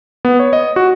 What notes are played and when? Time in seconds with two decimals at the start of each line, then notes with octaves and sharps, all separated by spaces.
0.25 B3
0.40 C#5
0.53 D#5
0.76 F#4